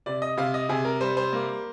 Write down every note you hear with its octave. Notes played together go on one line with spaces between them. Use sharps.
C3 D5
D#5
C3 F5
D#5
C3 G#4
A#4
G3 C5
C5
A#3